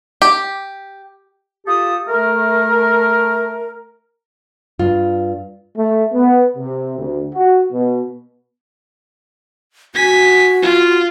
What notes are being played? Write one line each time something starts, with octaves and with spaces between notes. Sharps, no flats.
G4
F4 G4 A4 D#6
A3 A#4
G2 F4
A3
B3
C3
D2
F#4
B2
F#4 G#5 B6
F4